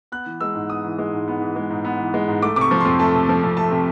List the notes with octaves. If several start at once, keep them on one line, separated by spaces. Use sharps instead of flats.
B3 F#6
E3
G#3 E6
G#2
B3 D#6
E3
G#3
G#2
B3
E3
G#3
G#2
B3
E3
G#3
G#2
A3 D6
C3 C#6 D6
F3
F2 C6
A3 A5
C3
F3
F2
A3 A5
C3